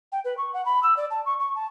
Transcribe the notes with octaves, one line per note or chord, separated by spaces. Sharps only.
G5
B4
C#6
F#5
B5
E6
D5
A5
C#6
C#6
A5